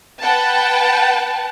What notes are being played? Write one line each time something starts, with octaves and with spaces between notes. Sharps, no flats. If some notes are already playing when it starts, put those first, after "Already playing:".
B4 F#5 G5 A5